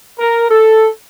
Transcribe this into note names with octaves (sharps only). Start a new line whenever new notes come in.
A#4
A4